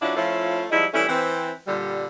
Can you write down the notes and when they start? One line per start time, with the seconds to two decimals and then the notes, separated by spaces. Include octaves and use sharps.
0.02 F#3 C#4 D4 E4 F4
0.16 F3 A3 C#4 E4 F4
0.71 F3 G3 G#3 D#4 E4
0.94 E3 G3 A3 C#4 E4
1.09 E3 C4
1.67 A#2 D3 G3